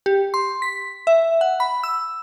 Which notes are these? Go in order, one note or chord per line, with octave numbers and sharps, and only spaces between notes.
G4
C6
B6
E5
F#5
B5
E6